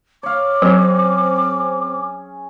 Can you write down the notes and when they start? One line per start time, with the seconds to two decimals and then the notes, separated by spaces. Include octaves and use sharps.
0.23 C#5 F5 D6
0.62 F#3 C4 C#4 G#4